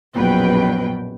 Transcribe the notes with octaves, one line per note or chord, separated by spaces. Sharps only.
A#1 F#2 B2 B4 G5